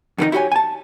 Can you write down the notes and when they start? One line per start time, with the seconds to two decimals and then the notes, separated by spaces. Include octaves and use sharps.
0.18 F2 D#3 A#3 D#4
0.32 E4 F#4 G4 C#5 G#5
0.52 G#5 A5